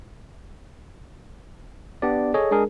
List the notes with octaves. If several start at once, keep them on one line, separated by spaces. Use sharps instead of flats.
B3 D4 G4 D5
G#4 A4 C#5 D#5
G#3 D4 G#4 A#4